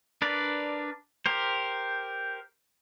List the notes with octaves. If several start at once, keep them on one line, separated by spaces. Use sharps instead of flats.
D4 A#4 B4 D5
G4 A#4 C5